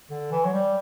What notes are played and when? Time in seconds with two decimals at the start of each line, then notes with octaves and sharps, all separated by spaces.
0.10 D3
0.32 E3
0.45 F#3
0.53 G3